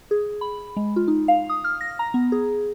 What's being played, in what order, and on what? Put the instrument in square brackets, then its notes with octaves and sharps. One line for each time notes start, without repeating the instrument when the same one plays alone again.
[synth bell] G#4
B5
G#3
F4
D#4
F5
D#6
F6
A#6
A#5
B3
G#4